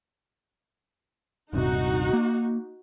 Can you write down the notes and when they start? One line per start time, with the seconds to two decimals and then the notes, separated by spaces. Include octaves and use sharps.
1.53 D#1 G2 C3 D#4 F#4
2.13 A#3